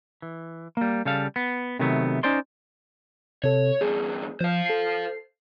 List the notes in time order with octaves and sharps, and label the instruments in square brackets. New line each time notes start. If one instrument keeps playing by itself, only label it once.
[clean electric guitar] E3
G3 A#3
C#3 G3 A4 F5
B3
C3 D#3 F#3 A3 B3
C#4 D#4 C5 D5 C6
[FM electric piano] C3 A4 [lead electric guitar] C#5
[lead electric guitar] E2 G2 [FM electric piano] G#4
[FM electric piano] F3 [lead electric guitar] C5 F5
[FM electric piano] A4 C7